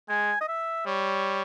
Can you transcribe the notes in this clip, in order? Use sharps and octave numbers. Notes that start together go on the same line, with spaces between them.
G#3 G#5
D#5
E5
G3 C#5